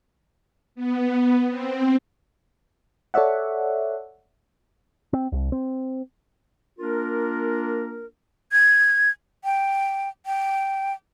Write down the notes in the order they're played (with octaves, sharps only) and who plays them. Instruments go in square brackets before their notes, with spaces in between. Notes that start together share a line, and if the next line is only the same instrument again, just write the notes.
[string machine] B3
C4
[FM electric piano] A4 C#5 D5 E5 F#5
[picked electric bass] C4
C2
C4
[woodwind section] A#3 D4 F4 A#4
[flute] G#6
G5
G5